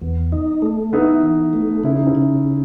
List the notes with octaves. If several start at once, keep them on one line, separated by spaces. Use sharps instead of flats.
E2 B3
D#4
A3
B3 D#4 E4
E3
A3
C#3 E4
D#4
C#4 E4
C#3